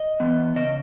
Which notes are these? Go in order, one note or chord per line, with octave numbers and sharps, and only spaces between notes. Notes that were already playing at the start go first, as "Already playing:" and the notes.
Already playing: D#5
E3 B3
C#3 D#5